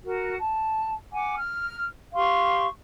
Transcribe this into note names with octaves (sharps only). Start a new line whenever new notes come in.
F#4 A#4
A5
F#5 G#5 D6
F6
G4 F5 C6 C#6